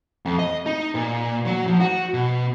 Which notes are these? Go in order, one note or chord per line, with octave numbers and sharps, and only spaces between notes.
F2
D#5
D#4
A#2
F#3
F3
F#4
B2